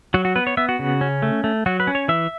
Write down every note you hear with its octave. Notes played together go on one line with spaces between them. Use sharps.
F#3 F#4
F#4
B3 B4
C#5
B3 E5
F#4
C#3
C#4
A3
A3
F#3 F#4
B4
C#4
C#5
E3 E5